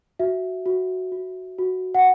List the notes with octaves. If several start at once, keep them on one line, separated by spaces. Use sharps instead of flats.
F#4 E5
F#4
F#4
F#4
F#5